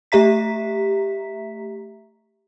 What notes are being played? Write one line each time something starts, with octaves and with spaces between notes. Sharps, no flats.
A3 G4 E5 A#5 B6